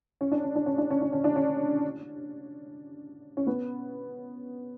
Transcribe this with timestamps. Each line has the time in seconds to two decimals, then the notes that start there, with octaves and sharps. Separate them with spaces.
0.21 C#4
0.32 D4
0.44 C#4
0.55 D4
0.66 C#4
0.78 D4
0.91 C#4
1.02 D4
1.13 C#4
1.24 D4
1.36 C#4
3.37 C#4
3.47 B3